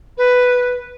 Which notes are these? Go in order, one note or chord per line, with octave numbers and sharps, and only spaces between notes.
B4